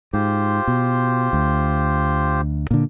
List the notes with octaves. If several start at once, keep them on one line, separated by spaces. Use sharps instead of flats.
G#2 F4 G4 C5
B2
D2
A#2 D3